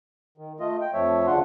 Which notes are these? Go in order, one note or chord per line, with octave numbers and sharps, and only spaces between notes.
D#3
A3 F4 D#5
G5
F2 F3 A3 C#5 E5
D2 C#3 D4 F4 F#5 C6